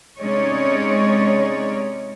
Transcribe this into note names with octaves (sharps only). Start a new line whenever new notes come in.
C3 G#3 C#4 D#4 C#5 D5